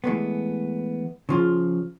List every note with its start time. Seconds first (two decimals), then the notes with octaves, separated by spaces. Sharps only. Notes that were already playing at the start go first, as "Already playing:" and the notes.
0.04 E3 G#3 A3 B3
1.29 C#3 F3 F4